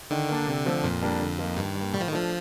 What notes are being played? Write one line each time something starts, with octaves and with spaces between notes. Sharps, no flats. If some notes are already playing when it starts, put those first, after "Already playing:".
D3 D#3
A#3 D4
C3
F3 A3 C4
F2 A#2
G3 A#3 D4
D3
F3 A#3 D#4
G2 D#3
G3
A#3
A2 G3
F3
D#3
F3 A3 D4 F4